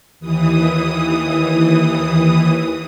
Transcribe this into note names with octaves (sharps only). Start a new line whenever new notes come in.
D#2 E3 D#6